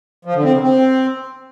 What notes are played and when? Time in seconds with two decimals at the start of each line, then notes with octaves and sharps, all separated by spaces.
0.25 F3
0.34 D3
0.44 C4
0.53 C#3
0.62 C4